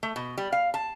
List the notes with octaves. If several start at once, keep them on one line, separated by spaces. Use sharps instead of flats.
A3
B2
G3
F5
A5